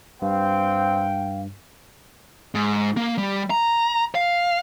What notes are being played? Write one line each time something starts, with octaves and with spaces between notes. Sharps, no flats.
G2 C4 F5 G5
G#2
A#3
G3
A#5
F5